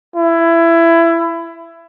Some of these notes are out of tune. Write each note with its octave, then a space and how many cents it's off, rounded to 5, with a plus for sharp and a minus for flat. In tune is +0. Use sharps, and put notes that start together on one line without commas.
E4 +20